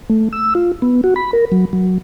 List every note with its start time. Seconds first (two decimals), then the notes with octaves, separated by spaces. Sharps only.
0.10 A3
0.32 E6
0.55 F4
0.82 B3
1.04 F#4
1.16 B5
1.33 A#4
1.52 F#3
1.73 F#3